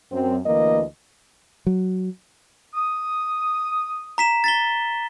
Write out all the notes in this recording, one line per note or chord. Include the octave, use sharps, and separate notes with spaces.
F#2 C4
D2 E3 A#3 D#5
F#3
D#6
A#5 B6 E7
A6 B6 G7